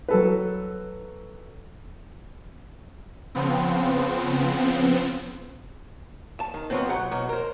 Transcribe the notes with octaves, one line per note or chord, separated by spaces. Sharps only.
F#3 A4 B4
C#3 F3 B3 C4
A5
D#3
D#3 F3 F#3 B3 C4
B1 F#3 F#5 B5
B2 E3 F#3
A#4 C5